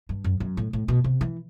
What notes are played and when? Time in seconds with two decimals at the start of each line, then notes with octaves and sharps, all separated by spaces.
0.09 G2
0.24 F#2
0.40 F#2
0.57 A2
0.73 A2
0.88 B2
1.04 C3
1.21 E3